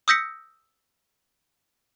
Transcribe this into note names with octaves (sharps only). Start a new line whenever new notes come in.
D#6 E6 G6 A#6 B6 C#7